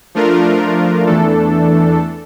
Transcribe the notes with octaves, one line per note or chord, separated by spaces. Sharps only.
F3 A3 D4 F4 A#4
E2 E3 A3 D4 A4